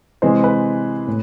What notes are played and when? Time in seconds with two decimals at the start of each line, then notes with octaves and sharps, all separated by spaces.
0.22 C3 E3 G#3 C5
0.44 B4
1.07 A2